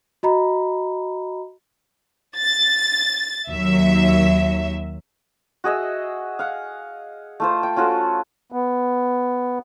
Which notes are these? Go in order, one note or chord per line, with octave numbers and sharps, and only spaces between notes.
F#4 D#5 A#5 B5
A6
D#2 F#3 E5
F#4 G#4 D#5 E5
F5 F#5
A3 F4 C5
G5
C#4 F4 F#4 A4
B3